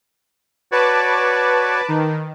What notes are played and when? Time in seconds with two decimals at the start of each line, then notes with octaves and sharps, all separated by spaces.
0.72 F#4 B4 C#5 D5 A5 D6
1.88 D#3 D#4